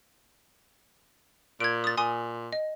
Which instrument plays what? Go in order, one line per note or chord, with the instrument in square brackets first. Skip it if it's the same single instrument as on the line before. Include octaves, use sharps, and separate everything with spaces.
[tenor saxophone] A#2 [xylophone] G#6 D7
[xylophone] D#6 A6
[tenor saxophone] A#2 [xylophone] G#5 C6 D#6
[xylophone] D#5